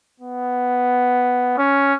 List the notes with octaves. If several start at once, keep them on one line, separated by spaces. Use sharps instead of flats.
B3
C#4